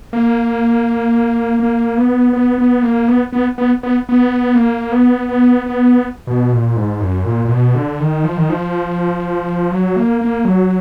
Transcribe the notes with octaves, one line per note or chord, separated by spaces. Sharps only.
A#3
A#3
B3
B3
B3
A#3
B3
B3
B3
B3
B3
A#3
B3
B3
B3
B2
A#2
G#2
F#2
A#2
A#2
B2
D3
D#3
F3
D#3
F3
F#3
A#3
A#3
F#3